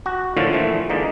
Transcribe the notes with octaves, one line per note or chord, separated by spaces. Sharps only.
F#4
A2 D3 D#3 F3 F4
A#2 E3 F3 A3
D3 E3 G#3 A#3 D#4